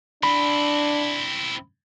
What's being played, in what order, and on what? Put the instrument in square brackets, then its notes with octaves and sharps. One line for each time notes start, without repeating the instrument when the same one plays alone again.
[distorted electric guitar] C4 E4 [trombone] D4 [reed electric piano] B5